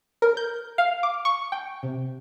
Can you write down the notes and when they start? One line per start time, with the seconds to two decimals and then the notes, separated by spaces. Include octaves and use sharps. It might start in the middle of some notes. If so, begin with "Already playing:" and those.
0.22 A#4
0.37 G6
0.78 F5
1.03 D6
1.25 C#6
1.52 G5
1.83 C3